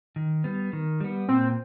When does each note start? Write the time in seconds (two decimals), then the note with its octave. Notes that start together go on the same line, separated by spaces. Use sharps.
0.16 D#3
0.44 G3 B3
0.73 D#3
1.00 G3 B3
1.28 A#2 C4